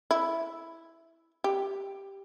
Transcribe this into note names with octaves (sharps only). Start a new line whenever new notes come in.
E4
G4